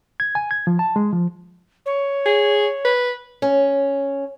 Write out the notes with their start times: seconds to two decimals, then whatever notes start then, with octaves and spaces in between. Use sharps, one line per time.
0.20 G#6
0.35 G#5
0.51 G#6
0.67 F3
0.79 A5
0.96 G#3
1.13 F3
1.86 C#5
2.26 G#4
2.85 B4
3.42 C#4